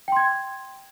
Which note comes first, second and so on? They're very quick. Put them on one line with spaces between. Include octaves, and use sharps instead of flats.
G5 C6 G#6